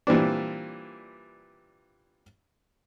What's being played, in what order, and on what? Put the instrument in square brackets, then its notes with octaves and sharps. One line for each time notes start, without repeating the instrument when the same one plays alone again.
[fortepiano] A#2 E3 G3 C4 D4